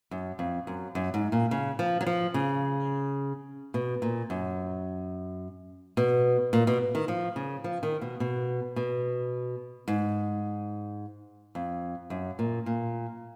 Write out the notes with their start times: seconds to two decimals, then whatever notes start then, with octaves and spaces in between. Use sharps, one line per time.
0.11 F#2
0.39 F2
0.67 F#2
0.95 F#2
1.14 G#2
1.32 A#2
1.51 C#3
1.79 F3
2.01 F#3
2.06 F3
2.34 C#3
3.74 B2
4.02 A#2
4.30 F#2
5.97 B2
6.53 A#2
6.67 B2
6.95 D#3
7.08 F3
7.36 C#3
7.64 F3
7.83 D#3
8.01 B2
8.20 B2
8.76 B2
9.88 G#2
11.55 F2
12.10 F#2
12.39 A#2
12.66 A#2